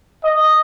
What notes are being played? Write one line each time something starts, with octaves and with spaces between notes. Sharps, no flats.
D#5